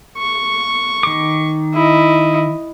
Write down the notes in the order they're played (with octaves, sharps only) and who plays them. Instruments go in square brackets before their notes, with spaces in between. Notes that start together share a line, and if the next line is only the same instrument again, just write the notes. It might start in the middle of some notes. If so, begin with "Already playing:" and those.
[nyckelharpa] C#6
[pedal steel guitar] D#3 D6
[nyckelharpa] E4 D#5